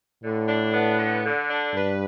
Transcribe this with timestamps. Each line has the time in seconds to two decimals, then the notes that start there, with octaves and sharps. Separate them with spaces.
0.23 A2 D3
0.48 D4
0.74 B3
0.99 D3
1.25 D3
1.50 D4
1.74 G2 B4